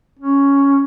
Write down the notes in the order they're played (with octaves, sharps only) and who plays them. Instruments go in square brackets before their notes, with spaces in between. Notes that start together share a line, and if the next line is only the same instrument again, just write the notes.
[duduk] C#4